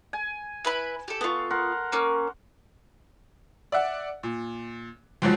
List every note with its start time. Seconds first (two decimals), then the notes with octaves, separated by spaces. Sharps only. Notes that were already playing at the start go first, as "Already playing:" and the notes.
0.13 G#5
0.65 E4 B4 B5
1.08 G4 A4
1.21 B3 F4 A4 C#6
1.50 A#4 F#5 C6
1.92 A#3 C#4
3.72 D5 E5 F#5
4.23 A#2
5.22 G1 C#2 G#2 F3 F#3